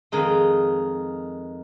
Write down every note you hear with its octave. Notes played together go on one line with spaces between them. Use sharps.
F2 D#3 G#3 D#4